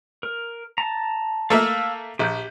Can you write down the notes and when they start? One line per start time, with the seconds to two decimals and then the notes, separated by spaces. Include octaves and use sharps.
0.23 A#4
0.78 A5 A#5
1.50 A3 A#3 E5 F5 E6 F6
2.19 A#1 G4 G6